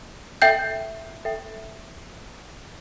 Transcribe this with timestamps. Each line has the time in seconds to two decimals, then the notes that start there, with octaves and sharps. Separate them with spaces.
0.42 A4 E5 G5 G6
1.25 A4 E5 G5